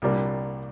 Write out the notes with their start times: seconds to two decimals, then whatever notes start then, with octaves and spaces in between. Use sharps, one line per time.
0.02 C2 A#2 G3 A#3 D4